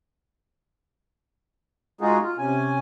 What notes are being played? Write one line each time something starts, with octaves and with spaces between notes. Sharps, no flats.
G#3 D#4 F4 F#4 G#4
F4
C3 C#4 G#5